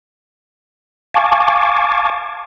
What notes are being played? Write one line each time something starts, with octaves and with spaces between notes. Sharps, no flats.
F5 G#5 A5 C#6 D6